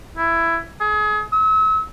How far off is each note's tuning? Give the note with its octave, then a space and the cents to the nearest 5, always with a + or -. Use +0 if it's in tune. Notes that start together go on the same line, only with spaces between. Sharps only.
E4 +15
G#4 +30
E6 -40